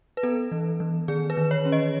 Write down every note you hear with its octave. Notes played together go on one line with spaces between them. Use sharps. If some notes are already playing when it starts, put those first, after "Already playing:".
B4
B3 A4
E3
E3
D#3 G#4
B4
D#3
C#5
C#4
D#5